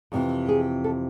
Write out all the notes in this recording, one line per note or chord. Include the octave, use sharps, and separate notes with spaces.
F2 C3 E3
G#4
A4